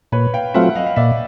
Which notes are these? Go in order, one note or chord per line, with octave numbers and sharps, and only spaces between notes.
A#2 B4 C#5
F5 G5
F#3 A3 C4 F4 E5 F#5
D#5 F5
F5
A#2 D5 E5